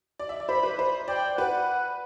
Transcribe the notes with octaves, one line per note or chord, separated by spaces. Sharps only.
D5
E5
D5
C5 B5
B4
C5 B5
D5 G5
B4 F#5